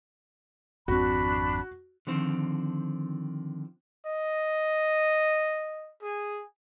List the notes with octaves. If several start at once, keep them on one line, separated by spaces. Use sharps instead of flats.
G#1 F2 C4 D4 F#4 B5 F#6
D3 D#3 F3 C4
D#5
G#4